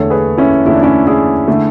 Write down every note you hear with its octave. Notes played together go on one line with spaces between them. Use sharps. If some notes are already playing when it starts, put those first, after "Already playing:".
Already playing: E2 D3 A3 A4 C#5
G#4 B4
C#4 E4
E2 D3 A3 E4
D4
C#4 E4
E4 G#4
D3 A3